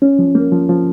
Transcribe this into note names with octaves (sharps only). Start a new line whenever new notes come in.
C#4
F3
A#3
F3
F3